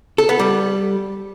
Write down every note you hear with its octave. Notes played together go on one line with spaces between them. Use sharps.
A4
B3
G3